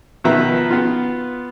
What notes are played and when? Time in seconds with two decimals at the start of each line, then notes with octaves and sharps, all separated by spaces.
0.24 B2 D#3 F3 B4 E5 A#5
0.71 B3 F4